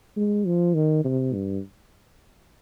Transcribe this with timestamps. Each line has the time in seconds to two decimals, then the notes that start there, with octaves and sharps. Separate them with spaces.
0.17 G#3
0.46 F3
0.74 D#3
1.04 C3
1.34 G2